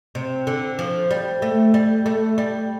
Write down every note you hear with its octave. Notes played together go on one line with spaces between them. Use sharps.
C3
D3
F3
G3
A3
G3
A3
G3